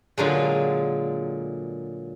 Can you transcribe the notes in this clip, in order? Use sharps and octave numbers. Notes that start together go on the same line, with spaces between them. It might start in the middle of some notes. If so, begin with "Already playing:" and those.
A#2 D3 F#3 G#3